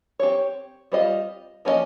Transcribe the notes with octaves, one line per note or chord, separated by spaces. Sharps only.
C4 G4 C#5
G3 C4 F4 C5 D#5
F3 A#3 C#4 G#4 D#5